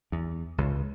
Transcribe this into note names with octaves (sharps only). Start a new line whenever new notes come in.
E2
C#2